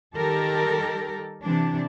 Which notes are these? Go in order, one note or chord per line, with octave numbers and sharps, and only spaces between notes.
D#3 G3 G4 A4 A#4
C3 E3 D4